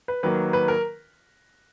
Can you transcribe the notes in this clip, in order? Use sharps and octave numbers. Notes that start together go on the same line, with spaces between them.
B4
D#3 F#3 A#3 B4
B4
A#4